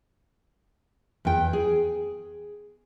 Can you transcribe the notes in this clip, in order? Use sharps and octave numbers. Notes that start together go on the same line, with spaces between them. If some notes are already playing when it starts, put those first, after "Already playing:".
E2 G5
G#4